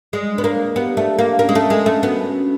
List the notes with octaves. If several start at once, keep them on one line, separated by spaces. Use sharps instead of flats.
G#3 D5
B3 D4
A#3
A#4
B3 G4
A3 D5
A#3 D4
A#3 C#4
G#3
A3 C#4
G#3
A#4
A3
B3 F#4
C#4